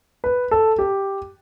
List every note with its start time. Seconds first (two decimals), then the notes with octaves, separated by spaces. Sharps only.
0.24 B4
0.51 A4
0.79 G4